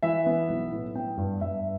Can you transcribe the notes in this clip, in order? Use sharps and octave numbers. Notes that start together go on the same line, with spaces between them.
E3 E5
B3
B1
A2
B3 G5
G2
G2 E5